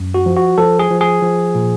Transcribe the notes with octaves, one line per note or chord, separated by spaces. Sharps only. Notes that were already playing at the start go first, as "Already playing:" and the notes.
Already playing: F#2
F#4
F3
F#4
F3 A4
G#4
F3
G#4
F3
A#2